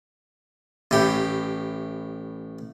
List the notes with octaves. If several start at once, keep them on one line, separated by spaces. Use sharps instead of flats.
A1 A2 G4